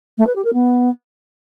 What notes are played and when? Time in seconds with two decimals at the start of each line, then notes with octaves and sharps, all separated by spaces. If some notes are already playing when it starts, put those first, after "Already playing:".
0.18 A3
0.27 B4
0.36 G4
0.44 A#4
0.53 B3